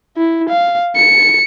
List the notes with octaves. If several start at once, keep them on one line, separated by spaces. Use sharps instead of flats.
E4
F5
C#7